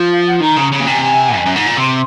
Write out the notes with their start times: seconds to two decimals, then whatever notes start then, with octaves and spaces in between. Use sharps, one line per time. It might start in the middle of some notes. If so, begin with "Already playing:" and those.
Already playing: F3
0.11 F5
0.26 F#5
0.41 D#3 A#5
0.56 C#3
0.72 C#3
0.80 A#2
0.86 C3 G#5
1.36 F2
1.46 F#2
1.56 G#2
1.67 A#2
1.77 C3 C6